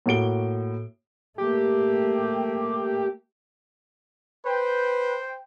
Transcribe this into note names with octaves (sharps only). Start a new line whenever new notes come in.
A2 A#3 F#4 D7 G7
A3 A#3 G4
B4 C5 G5